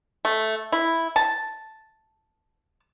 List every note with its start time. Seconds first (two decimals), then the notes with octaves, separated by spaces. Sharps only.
0.25 A3
0.72 E4
1.16 A5